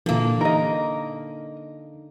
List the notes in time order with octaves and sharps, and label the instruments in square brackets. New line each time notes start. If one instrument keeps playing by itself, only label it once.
[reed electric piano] A#2 E3 [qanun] D3 A#3
[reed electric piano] D#4 [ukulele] A#4 D#5